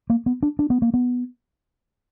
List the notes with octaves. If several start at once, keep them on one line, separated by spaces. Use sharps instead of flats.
A#3
B3
D4
D4
B3
A#3
B3